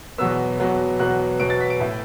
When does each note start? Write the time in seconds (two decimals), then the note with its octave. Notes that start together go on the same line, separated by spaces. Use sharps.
0.18 E2 B2 F#3 B3 E6
0.59 E2 B2 F#3 B3
0.99 E2 B2 F#3 B3 F#6
1.40 E2 B2 F#3 B3 D7
1.50 A6
1.61 B6
1.70 D7
1.80 A2 A3